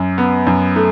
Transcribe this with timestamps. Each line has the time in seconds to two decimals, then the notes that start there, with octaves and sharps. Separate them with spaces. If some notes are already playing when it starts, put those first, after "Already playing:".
Already playing: F#2
0.18 B3
0.47 F#2
0.76 A3